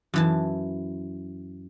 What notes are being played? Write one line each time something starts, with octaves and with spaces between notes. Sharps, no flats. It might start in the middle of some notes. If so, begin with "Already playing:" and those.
F#2 E3 A5